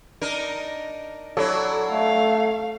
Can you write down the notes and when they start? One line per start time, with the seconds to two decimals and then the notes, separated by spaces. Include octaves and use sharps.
0.21 D4 D#4 A#4
1.37 F#3 D4 E4 A4 C#5 D6
1.91 A3 F5